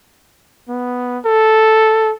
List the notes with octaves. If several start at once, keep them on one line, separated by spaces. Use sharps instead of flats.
B3
A4